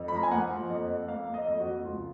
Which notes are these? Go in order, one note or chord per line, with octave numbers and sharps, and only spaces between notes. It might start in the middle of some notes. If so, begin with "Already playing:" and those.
Already playing: F2
B5
F3 A#5
G#5
A#3 F#5
F3
F2
F2
A#3 F5
A#3
D#5
F2
F#4
F2
C#2 F4